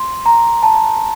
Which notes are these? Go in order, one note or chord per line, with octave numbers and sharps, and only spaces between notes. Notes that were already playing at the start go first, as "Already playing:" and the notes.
Already playing: C6
A#5
A5